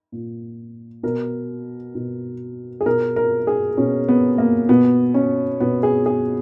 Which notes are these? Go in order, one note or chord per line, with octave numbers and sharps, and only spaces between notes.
A#2
B2 A#4
B2
G#4
B2 A#4
A#4
G#4
B2 C#4
B3
A#3
B2 B3
C#4
B2 B3
G#4
G#4